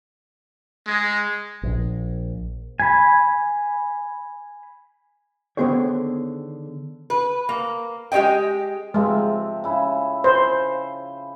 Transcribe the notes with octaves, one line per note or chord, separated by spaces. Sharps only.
G#3
A#1
G#5 B5
D3 D#3 B3 G#4 C5 C#5
B4
A#3
G#3 G4 C#5 D#5 G5
C3 F3 G#3 E5
C#3 E4
C5